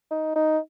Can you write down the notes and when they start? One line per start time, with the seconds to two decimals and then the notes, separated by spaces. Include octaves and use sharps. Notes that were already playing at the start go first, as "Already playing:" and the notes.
0.11 D#4
0.36 D#4